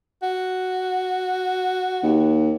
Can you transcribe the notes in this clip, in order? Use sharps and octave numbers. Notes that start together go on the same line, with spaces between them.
F#4
D#2